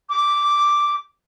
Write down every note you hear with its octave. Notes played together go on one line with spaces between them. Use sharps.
D6